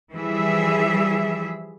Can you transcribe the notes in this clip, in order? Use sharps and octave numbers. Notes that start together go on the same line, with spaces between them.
E3 F3 G3 E4 G#4 E5